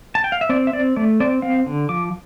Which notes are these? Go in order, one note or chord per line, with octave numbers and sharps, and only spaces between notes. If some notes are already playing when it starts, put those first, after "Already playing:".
A5
G5
F5
E5
C4 D5
E5
C4 D5
A3 D5
C4 D5
C4 F5
D3
F3 D6